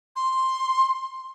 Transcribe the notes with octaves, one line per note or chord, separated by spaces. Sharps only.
C6